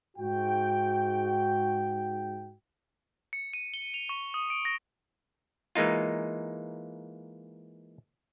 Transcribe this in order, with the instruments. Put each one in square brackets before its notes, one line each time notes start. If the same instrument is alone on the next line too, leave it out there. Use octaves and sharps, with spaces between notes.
[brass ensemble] G#2 F#4 G5
[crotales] C#7
D#7
G7
F7
C#6
D#6
D7
A#6
[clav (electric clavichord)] E3 G#3 A#3 D#4 F4